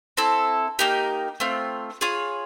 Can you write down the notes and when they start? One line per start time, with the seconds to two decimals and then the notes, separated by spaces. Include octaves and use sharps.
0.17 C4 E4 A4
0.79 A#3 D#4 G4 A#4
1.40 A3 C4 F4
2.01 F4 G#4 C#5